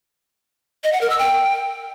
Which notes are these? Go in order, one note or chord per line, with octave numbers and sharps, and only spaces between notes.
D#5
F#5
A#4
E6
G5